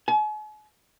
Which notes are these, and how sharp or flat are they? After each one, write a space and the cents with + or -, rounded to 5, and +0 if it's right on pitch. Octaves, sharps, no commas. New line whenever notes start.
G#5 +45